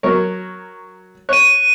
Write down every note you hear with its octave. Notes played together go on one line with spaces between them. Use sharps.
F#3 A#4 C#5
C#5 F#6 D#7